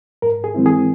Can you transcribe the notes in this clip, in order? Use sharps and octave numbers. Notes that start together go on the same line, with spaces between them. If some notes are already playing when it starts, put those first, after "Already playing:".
G#2 A#4
G#4
E3 G#3 C4 E4
G#4